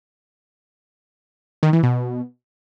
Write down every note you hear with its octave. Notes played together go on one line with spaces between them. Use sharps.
D#3
E3
B2